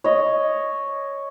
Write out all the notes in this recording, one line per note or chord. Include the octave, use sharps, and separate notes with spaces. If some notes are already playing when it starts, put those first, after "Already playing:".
C#5 D#5